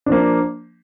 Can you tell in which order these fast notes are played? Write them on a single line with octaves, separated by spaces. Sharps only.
D4 F3 A#3